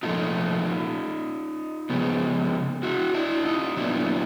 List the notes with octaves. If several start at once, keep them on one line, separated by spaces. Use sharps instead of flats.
A#2 F3 A3 D#4 F4
C#3 F3 G#3 B3
E4 F#4
D4 E4
D#4 F4
A#2 F#3 B3 D4 E4